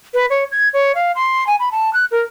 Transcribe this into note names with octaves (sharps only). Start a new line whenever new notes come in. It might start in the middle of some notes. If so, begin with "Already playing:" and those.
B4
C#5
G#6
C#5
F5
C6
G#5
B5
A5
F#6
A#4